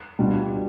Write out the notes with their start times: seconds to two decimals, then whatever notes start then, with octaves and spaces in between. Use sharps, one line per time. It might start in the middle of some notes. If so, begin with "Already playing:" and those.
0.19 B2 G3 D4 F4